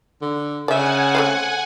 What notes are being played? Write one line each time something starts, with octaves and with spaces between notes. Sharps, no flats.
D3
C#3 D5 E5 F#5 G#5
A3 C4 F5